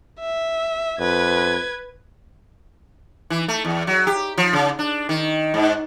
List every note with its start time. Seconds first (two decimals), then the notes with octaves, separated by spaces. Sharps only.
0.20 E5
0.99 F2 B4 G#6
3.30 E3
3.48 A3
3.65 E2
3.87 F#3
4.07 G4
4.38 F3
4.53 C#3
4.79 D4
5.09 D#3
5.54 G#2